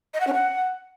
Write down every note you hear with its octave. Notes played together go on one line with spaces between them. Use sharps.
D#5
F#5
C#4
F#5